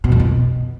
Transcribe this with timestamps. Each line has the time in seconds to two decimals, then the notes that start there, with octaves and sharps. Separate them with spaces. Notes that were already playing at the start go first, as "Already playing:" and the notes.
0.04 B2
0.12 F2
0.20 B2